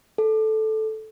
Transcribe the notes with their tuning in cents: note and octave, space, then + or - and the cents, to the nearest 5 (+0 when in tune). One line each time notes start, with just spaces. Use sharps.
A4 -10